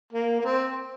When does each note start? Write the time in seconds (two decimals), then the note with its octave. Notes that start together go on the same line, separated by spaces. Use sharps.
0.13 A#3
0.40 A#3
0.45 C4